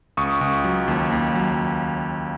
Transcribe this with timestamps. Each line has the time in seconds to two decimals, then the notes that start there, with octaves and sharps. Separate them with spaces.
0.17 C#2 C#6 D#6
0.41 C#2
0.64 F#3
0.88 D#2
1.11 D#2
1.35 F#3